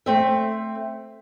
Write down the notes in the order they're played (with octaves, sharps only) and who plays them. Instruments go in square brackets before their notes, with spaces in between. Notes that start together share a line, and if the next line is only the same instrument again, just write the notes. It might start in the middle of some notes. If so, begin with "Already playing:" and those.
[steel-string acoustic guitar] A3 C4 E5